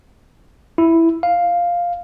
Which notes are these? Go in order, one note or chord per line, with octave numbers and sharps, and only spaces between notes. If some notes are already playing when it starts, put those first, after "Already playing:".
E4
F5